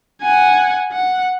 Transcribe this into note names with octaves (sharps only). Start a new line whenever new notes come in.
F#5 G#5
F#5